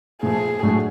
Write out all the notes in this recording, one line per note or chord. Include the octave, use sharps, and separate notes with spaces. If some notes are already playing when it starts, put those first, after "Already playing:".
A#2 F3 A3 G#4
A2 F#3 A3 D4